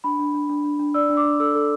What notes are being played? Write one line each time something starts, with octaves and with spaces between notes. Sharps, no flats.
D4 B5
D4
D4
D4
D4
D4
D5 E6
D4
D6
D4
A4 E6
A4